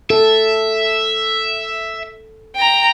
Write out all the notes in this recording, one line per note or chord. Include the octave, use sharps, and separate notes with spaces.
A4 E5
G5 A#5